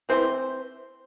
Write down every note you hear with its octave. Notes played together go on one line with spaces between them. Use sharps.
C3 E3 A3 C4 C5